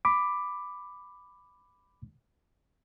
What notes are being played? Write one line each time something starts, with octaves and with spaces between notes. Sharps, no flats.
B5 D6